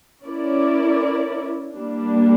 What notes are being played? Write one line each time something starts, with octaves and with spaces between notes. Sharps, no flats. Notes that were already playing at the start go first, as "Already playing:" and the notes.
C#4 E4 A#4 D5
G3 A#3 D4